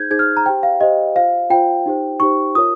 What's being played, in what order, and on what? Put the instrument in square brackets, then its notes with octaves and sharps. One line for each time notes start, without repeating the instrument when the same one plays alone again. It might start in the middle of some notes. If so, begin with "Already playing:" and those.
Already playing: [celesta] D#4 G#4 C5 G6 G#6
D#4 G#4 C5 G#6
F6
A#5
G4 C5 G5
F5
G4 C5 D#5
F4 C5 F5
F4 C5 G5
D#4 G4 C5
D#4 G4 C5 C#6
F4 A#4 C#5 D#6